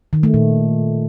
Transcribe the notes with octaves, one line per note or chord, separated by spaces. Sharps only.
D#3
A3
A#2